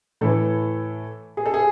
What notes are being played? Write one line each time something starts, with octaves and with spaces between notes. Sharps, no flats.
A2 E3 A4
G#4
A4
G#4